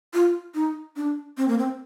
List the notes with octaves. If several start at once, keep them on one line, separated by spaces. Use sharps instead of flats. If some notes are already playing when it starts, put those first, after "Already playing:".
F4
D#4
D4
C4
A#3
C4